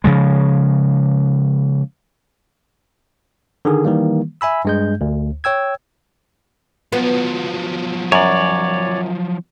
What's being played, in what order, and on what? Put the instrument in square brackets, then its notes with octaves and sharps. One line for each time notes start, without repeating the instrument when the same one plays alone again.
[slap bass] C#3 F3 G#3
[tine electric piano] D3 D#3 G#4
D#3 E3 G3 A#3
E5 G#5 B5 E6
G2 G#3 G6
D2
C#5 G5 E6 G#6
[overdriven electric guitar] F3 F#3 [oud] B3
[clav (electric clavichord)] F#2 [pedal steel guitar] C#5 D5